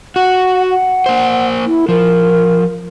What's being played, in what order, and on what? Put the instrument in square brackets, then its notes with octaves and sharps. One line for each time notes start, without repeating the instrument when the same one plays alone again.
[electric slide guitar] F#4 [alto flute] F#5
[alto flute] F#5
[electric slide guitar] A#3 C5
[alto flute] E4
[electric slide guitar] F3 [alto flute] A#4